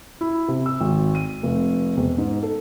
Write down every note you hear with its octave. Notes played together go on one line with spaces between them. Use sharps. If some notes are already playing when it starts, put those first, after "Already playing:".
E4
C3
E6
G#1
D#7
F1
E1
G#2
A4